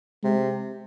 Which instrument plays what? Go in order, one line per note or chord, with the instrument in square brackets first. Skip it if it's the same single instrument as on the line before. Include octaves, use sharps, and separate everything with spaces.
[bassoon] C3 [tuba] G#3